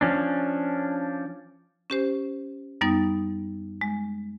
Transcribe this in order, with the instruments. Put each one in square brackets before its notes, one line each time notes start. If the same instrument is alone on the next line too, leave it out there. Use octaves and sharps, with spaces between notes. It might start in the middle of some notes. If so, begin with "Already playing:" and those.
[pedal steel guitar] F3 C#4 D4
[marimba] C#4 G4 C5
F#2 G3 B3 D#4 D#6
G#3